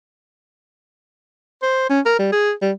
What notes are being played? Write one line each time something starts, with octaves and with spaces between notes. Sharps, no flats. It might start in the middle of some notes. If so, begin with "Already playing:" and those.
C5
C#4
A#4
G3
G#4
G3